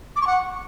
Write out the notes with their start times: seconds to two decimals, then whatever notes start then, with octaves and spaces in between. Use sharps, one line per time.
0.16 D6
0.21 C#6
0.27 F#5